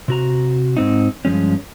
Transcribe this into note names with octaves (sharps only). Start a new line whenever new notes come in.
C3 F#4 A#5
G#2 C4 D#4
G2 A#2 F3 G#3 C#4